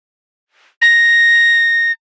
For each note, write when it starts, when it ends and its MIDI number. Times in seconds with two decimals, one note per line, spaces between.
0.82 1.92 94